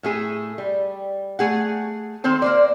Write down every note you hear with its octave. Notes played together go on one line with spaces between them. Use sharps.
A2 A3 G#4 A4
G3
A3 G#4 F#5
D#3 C4 A4 C5 A5
A#3 C5 D5